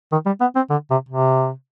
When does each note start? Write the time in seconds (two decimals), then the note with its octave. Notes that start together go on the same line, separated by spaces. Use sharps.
0.12 D#3
0.26 G3
0.41 B3
0.56 C4
0.70 D3
0.91 C3
1.09 C3